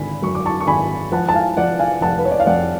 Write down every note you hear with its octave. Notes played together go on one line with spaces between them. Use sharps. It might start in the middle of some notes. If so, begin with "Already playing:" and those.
Already playing: G#1 D3 G#5 B5
F#2 C#6
D6
A5 C#6
C#6
G#1 G#5 B5
F3 F#5 A5
A5
F5 G#5
F3 D5 F#5
F5 G#5
F1 F#5 A5
B4
C#5
D5
F5
F2 D5 F#5